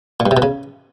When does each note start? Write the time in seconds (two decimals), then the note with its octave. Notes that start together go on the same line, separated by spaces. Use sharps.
0.20 A#2
0.26 G2
0.31 C3
0.37 B2
0.42 C#3